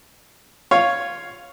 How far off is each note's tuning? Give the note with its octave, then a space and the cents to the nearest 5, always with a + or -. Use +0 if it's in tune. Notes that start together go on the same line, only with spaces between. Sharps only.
F4 +0 C#5 +0 F5 +0